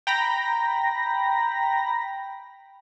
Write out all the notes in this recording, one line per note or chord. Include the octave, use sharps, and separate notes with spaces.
G5 A#5 B5 A#6